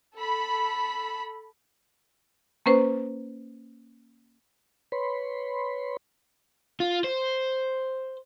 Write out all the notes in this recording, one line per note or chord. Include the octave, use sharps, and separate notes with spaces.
A4 B5
A#3 C#4 B4 C5
B4 C#5 B5 C6
F4
C5